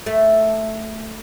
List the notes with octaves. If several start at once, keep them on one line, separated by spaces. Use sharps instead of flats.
A3